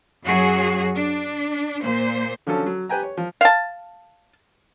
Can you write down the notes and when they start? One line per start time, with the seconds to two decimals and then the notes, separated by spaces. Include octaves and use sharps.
0.24 F#2 F#3 F#4 G#4
0.94 D4
1.82 A#2 C5
2.47 D3 F3 F#3 C#4 A4
2.66 F#3
2.89 G4 B4 G5 G#5 A#5
3.03 C#5
3.17 F3
3.41 F5 A5